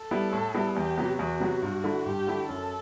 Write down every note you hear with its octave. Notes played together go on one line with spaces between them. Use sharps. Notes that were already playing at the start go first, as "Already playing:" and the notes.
Already playing: A4
G3 B3 E4
A2
G3 B3 E4
E2 G4
C3 F#3 B3
E2 F#4
C3 F#3 B3
G2
D3 A3 E4
G2 G4
D3 A3 E4
F#2 A4